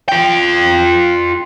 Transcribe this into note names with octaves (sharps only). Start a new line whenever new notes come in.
F4 G5